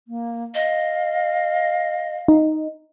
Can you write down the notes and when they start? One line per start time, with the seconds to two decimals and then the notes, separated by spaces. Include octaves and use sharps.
0.08 A#3
0.54 D#5 F5
2.28 D#4